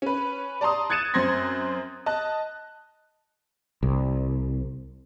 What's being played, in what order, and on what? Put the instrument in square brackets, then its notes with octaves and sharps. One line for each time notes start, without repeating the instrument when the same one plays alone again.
[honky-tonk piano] C#4 B4
D5 A5 A#5 C6 D#6
F#6 G#6 A6 C#7 D#7 E7
F#2 C4 C6 G#6 A#6
D#5 A5 F#6
[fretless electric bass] C2